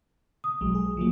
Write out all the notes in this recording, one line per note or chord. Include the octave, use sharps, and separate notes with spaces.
D#6
B1 F#3 G#3
G#4
F3 F#3 A#3